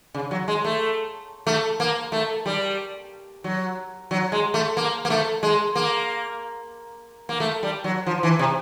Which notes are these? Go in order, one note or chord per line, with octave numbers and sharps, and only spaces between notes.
C#3
F#3
G#3
A3
A3
A#3
A3
G3
F#3
F#3
G#3
A3
A#3
A#3
A3
G#3
A#3
A#3
A3
G3
F#3
F3
E3
C3